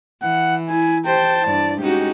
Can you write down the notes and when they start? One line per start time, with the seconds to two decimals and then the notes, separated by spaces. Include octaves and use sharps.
0.22 E3 F#5
0.69 E4 G#5
1.05 G4 C5 G5 A5
1.46 G2 E4 D5
1.81 G#3 C#4 D#4 F#4 G4